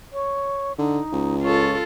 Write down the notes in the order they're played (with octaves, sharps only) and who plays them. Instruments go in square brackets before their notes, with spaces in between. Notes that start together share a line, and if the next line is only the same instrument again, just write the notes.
[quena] C#5
[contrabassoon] D3 [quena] D#4
[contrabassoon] C#2
[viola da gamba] F4 A4 [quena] C#5